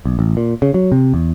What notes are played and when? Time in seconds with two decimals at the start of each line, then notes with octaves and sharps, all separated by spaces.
0.05 B1
0.19 A1
0.37 A#2
0.62 C#3
0.74 F#3
0.92 C3
1.14 E2